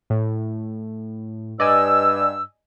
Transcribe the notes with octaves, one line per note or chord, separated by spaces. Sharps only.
A2
G2 D5 D#5 G#5 E6